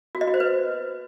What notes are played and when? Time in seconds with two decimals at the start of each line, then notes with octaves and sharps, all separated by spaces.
0.15 F#4
0.21 D#5
0.27 F#4
0.34 C5
0.40 B4